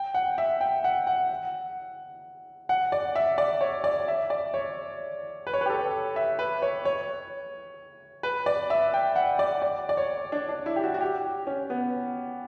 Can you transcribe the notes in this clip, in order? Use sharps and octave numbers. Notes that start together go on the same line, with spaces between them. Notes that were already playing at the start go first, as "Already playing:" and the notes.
Already playing: G5
F#5
E5
G5
F#5
F#5
F#5
D5
E5
D5
C#5
D5
E5
D5
C#5
B4
C#5
B4
G4
A4
E5
B4
C#5
C#5
B4
D5
E5
G5
F#5
D5
D5
D5
C#5
D4
D4
E4
G4
F#4
F#4
G4
C#4
B3